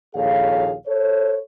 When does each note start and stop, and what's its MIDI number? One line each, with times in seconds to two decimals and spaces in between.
0.16 0.74 34
0.16 0.74 39
0.16 0.74 68
0.16 0.74 69
0.16 0.74 73
0.16 0.74 77
0.87 1.38 69
0.87 1.38 72
0.87 1.38 73